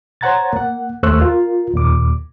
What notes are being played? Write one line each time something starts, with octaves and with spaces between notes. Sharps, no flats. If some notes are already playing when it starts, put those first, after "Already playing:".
C5 C#5 F#5 A#5 G#6 A6
A#3 F#5
D#2 A3 C5 C#6 E6 F#6
F4 A#4
D#2 A#2 D6